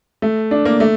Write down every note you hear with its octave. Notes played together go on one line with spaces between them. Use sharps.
A3
D4
A#3
A3